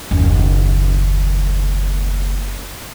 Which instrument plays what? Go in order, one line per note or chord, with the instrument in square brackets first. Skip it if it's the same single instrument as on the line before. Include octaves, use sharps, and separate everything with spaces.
[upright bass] F#1 D#2